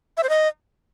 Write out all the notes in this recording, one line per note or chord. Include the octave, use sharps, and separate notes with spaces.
E5
C5
D#5